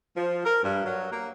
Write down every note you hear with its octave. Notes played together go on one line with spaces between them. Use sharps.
F3
A#4
G2
F#3
A#3